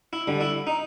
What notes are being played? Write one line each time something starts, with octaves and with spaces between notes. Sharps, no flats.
E4
D3 G3
E4
D#4